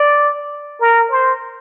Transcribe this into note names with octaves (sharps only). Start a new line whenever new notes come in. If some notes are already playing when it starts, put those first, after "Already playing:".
Already playing: D5
A#4
C5